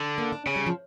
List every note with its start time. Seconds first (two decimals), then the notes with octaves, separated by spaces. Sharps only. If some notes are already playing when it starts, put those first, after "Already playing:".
Already playing: D3
0.18 A#3
0.32 D4
0.46 C#3 C#4
0.56 G3
0.66 F3